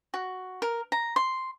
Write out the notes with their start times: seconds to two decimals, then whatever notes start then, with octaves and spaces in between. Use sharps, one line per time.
0.14 F#4
0.62 A#4
0.92 A#5
1.16 C6